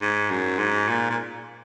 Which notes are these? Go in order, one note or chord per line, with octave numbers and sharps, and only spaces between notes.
G#2
F#2
G#2
A#2
A#2